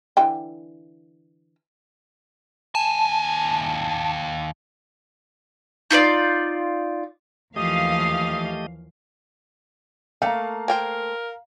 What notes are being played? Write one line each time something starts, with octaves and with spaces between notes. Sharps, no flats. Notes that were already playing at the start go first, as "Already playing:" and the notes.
D3 E3 G5
D#2 G#5 A5
D#4 F4 C5 D5
D#2 E3 F3 A3 G4 D#5 F5 D#6
A3 A#3 F5 A#5
A#4 C5 G5 G#5